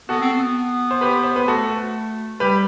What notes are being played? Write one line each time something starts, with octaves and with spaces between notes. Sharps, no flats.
B3 F#4 A4
C4
B3
C5
G4 B4
C5
B3 B4
A3 F#4 A4
G3 G4 B4